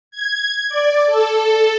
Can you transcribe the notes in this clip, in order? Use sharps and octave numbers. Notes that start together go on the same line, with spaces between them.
G#6
D5
A4